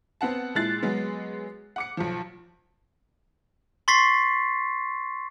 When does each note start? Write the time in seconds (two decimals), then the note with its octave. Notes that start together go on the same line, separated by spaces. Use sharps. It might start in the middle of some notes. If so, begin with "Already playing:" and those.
0.21 B3 C4 F#5 A5
0.55 A#2 G#3 E4 F#6 A6 C7
0.83 F#3 G#3 B3
1.76 F#5 D6 C#7
1.97 B1 F3
3.88 C6 C#6 A6 B6 C7